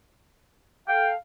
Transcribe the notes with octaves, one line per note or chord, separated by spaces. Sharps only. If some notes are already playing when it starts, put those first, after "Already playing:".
A4 F5 G5